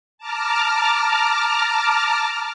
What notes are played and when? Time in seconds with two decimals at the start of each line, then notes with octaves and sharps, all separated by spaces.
0.18 A5 A#5 D6 F6